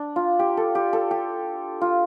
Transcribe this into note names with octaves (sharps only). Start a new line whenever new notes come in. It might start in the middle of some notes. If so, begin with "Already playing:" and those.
Already playing: D4
F4
G4
A4
G4
A4
G4
F4